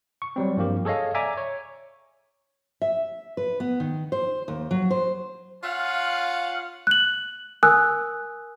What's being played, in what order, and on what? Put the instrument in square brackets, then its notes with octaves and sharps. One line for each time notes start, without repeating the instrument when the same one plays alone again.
[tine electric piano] C#6
F#3 G3 C4
G2 F3 A#3 G4
G#4 A4 C#5 D#5 F5
D5 E5 G#5 A#5 D6
C#5
[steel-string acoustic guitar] E5
B4
B3
D#3
C5
D#2
F#3
C5
[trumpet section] C#4 F5 F#5 [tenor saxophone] F4
[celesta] F#6 F#7
A#4 G#5 D#6 E6 F#6